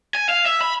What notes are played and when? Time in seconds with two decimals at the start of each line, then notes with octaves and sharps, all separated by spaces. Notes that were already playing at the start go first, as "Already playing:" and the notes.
0.15 G#5
0.29 F5
0.46 E5
0.61 B5